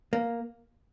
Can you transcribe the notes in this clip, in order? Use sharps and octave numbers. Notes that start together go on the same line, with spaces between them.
A#3